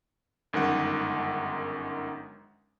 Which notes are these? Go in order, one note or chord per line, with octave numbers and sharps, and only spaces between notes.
G1 F#2 D#3 G#3 F#5